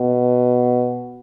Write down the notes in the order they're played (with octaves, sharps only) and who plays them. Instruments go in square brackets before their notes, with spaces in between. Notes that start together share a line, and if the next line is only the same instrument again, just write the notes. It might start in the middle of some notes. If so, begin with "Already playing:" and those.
Already playing: [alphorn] B2